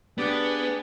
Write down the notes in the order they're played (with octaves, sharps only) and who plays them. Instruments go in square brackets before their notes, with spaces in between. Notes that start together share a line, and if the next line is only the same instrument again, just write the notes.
[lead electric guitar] B3 [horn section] D4 G4 G#4